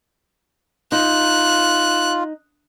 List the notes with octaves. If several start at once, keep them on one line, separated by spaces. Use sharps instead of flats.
D#4 F4 F#6